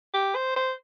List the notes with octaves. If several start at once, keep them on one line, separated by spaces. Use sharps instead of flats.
G4
C5
C5